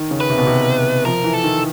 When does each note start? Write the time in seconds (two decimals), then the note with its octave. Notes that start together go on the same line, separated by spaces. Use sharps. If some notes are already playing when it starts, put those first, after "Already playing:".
Already playing: D#3
0.11 C#3
0.20 B4
0.30 C3
0.38 B2
0.46 C3
1.05 F3 A#4
1.24 E3
1.34 A4
1.44 D#3